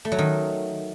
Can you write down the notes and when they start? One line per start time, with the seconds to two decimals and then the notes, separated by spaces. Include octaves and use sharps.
0.05 A3
0.12 F#3
0.19 D#3